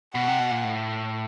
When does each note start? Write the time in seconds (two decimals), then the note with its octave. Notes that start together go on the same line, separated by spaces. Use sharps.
0.15 B2 F#5
0.28 C3
0.40 B2
0.51 A#2
0.64 A2